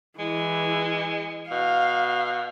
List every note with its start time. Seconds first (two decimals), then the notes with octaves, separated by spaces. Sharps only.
0.19 E3 G#3
1.51 B2 F5